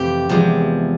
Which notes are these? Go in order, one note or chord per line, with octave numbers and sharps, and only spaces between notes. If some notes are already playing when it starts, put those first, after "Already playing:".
Already playing: F2 C3 E3 A3 G4
E2 C3 F3 G#3